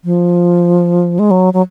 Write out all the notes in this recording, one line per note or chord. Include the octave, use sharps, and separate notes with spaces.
F3
G#3
F#3
F#3